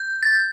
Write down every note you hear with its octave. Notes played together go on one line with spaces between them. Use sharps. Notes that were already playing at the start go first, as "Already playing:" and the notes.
Already playing: G6
A6